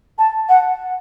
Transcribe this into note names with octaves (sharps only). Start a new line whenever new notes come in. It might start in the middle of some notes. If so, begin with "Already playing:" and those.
A5
F#5